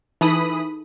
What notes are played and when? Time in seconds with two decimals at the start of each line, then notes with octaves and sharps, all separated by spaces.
0.21 E3 D#4 G#4 A4 B5 D#6